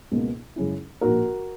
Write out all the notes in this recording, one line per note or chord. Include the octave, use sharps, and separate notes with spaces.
C#2 B2 A#3
F#2 C#3 G#3 C#4 E4
A#1 A#2 A#3 F#4 A#4